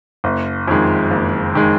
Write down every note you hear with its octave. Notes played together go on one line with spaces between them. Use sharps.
F#1
F2 D#3 G#3
F#1
D#3 G#3